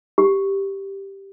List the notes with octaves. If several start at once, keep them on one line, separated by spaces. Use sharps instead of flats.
G4